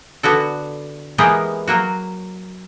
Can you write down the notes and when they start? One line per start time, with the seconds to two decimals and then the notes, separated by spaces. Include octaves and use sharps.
0.23 D3 B3 F#4 A4
1.18 E3 G#3 A#3 B3 G4 G#4
1.68 F#3 A#3 F#4